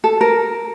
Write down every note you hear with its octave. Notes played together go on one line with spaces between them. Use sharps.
A4
A#4